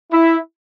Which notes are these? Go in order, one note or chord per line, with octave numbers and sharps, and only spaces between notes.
E4